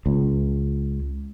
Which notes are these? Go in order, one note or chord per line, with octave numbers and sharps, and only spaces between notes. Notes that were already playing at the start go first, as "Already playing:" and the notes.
C#2